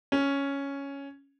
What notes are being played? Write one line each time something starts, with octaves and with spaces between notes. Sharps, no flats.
C#4